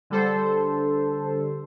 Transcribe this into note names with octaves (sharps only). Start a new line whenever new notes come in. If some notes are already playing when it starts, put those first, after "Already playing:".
D3 G3 A4 C5